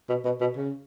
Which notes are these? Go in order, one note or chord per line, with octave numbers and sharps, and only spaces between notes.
B2
B2
B2
C#3